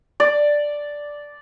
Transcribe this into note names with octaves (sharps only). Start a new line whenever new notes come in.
D5